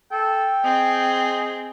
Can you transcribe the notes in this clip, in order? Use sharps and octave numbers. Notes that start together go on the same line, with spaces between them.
A4 G5
C4 G#4 D#5